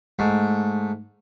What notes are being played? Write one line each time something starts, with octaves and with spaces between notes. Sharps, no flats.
G#2 A3